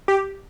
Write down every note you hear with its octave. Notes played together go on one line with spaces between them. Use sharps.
G4